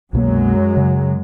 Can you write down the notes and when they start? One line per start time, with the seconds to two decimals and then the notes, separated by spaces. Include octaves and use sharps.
0.13 C2 F#2 B2 F#3 G#3 A#3
0.77 C#3